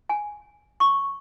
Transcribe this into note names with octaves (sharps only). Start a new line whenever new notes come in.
G#5
C#6